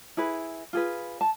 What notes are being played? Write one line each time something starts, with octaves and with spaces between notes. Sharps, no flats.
E4 G#4 B4
F4 G#4 B4
A5